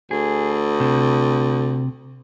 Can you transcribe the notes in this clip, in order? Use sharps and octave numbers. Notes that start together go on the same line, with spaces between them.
D2 G#4
C3